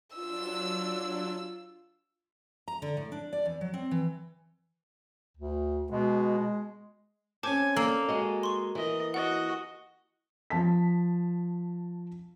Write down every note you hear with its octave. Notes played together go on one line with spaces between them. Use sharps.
F#3 D4 F4 E6
A#5
D3
A2
D4
D5
E2
F#3
C4
E3
D2
B2 G#3
C4 C#4 G#5 A5 D6 G6
A#3 A4 D5 E6
G#3 F#4 D#5
C6 C#6
E3 A#4 D#5
F#4 D#5 F#5
F3 A5 B6